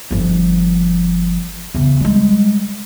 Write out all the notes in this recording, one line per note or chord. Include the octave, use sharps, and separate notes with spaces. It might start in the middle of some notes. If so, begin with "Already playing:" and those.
G1 F3
E2 C#3
G3 G#3